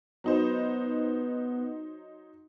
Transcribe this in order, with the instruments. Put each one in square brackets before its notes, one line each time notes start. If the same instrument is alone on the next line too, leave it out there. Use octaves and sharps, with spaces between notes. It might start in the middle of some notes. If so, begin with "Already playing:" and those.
[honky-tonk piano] F#3 D#4 C5 [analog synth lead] B3